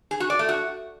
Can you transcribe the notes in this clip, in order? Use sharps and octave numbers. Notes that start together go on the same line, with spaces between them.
G#4
F#4
D5
A3
F#4